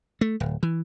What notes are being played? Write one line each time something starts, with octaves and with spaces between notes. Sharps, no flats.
A3
D1
E3